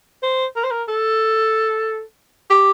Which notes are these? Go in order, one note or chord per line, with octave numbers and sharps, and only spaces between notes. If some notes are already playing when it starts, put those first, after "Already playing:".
C5
A#4
C5
A#4
A4
G4